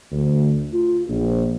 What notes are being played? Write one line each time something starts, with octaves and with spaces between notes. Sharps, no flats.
D2
F4
A#1